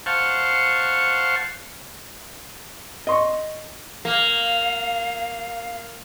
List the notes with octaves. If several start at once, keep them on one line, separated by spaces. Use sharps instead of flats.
C5 F5 F#5 A5 C#6
D#5 C6 C#6
A#3 F5